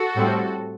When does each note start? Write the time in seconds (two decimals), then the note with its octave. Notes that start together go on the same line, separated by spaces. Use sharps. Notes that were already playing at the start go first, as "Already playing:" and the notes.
Already playing: F#4 A4
0.16 A2 G3 C4